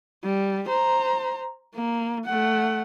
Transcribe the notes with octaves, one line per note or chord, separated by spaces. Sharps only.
G3
C5 A#5
A#3
A3 F#5